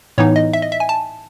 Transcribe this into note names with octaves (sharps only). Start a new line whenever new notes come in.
A2 E3 B3 D#4 C#5
D#5
E5
D#5
E5
G#5
A5